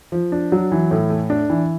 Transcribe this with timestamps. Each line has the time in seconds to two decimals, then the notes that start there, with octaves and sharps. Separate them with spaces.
0.12 F3
0.32 D4
0.52 F#3
0.72 E3
0.91 A2
1.10 A3
1.30 D4
1.50 E3